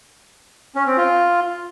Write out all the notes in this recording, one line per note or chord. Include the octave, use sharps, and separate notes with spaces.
C#4
C4
F4